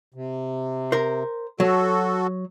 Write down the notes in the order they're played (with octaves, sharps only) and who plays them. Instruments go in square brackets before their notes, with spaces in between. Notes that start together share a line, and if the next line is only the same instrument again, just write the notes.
[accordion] C3
[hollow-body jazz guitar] A#4 C5
[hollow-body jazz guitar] F#3 [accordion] F#4 A4